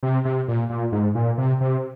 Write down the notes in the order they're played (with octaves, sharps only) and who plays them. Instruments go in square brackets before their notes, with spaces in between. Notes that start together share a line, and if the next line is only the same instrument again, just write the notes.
[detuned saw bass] C3
C3
A#2
A#2
G#2
A#2
C3
C3